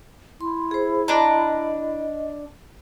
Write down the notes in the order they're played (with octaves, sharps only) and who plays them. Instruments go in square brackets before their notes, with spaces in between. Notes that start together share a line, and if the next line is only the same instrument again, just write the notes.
[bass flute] E4 [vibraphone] C6
[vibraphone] G#4 C5
[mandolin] D4 A#5 [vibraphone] D#5